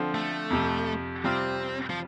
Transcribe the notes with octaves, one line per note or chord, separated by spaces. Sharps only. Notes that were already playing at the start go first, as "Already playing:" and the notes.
Already playing: D3 F3 C4
A3
F2 C3 F3
C3 G3 C4 F4
F3